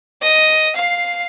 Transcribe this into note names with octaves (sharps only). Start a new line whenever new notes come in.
D#5
F5 C7